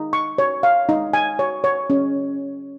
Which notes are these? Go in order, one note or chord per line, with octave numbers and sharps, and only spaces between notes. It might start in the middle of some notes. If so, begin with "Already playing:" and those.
Already playing: D#4
C#6
C#5
F5
D#4
G#5
C#5
C#5
C#4